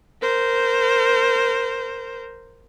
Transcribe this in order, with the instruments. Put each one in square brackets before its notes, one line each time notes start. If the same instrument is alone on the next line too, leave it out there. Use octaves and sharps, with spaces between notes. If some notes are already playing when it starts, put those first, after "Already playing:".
[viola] A#4 C5